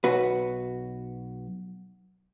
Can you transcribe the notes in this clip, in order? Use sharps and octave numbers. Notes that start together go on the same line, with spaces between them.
B1 F#4 B4